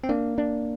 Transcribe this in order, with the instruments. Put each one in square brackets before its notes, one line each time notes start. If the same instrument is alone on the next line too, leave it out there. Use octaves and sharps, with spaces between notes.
[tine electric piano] C4
[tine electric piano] A#3 [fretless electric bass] D4
[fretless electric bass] D4